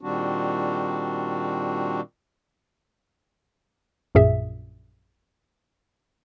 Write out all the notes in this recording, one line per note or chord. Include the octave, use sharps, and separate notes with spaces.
A#2 D#3 G3 C4 D4 F#4
A#1 F#2 A#2 G#4 E5